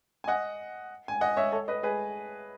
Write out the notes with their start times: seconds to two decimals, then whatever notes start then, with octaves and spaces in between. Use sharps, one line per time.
0.24 G#5
0.28 D#5 F#5
1.08 G#5
1.21 D#5 F#5
1.37 C#5 E5
1.52 A4 C#5
1.68 B4 D#5
1.83 G#4 B4